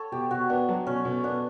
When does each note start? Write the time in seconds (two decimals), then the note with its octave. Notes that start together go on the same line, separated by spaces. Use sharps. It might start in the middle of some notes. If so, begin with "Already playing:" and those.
Already playing: A4 C#5
0.12 B2 G4
0.31 B2 F#4
0.50 B3 D4
0.69 F#3
0.87 B2 C#4
1.05 B2
1.24 B3 D4